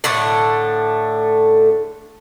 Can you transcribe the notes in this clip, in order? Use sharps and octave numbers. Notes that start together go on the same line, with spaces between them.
A2 D3 A3